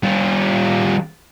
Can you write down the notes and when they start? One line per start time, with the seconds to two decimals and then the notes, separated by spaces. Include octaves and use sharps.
0.03 G3 F4